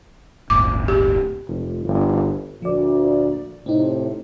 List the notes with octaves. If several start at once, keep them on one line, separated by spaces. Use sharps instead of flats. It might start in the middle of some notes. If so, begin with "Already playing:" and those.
D1 G1 D6
G4
F1
G1
D2 A#2 F3 D5
A2 C3 C4 D#4